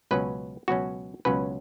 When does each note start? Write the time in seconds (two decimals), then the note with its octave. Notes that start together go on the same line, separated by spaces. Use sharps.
0.11 C#2 B2 F#3 C#4 B4
0.68 C#2 B2 F#3 C#4 F#4
1.25 C#2 B2 F#3 C#4 B4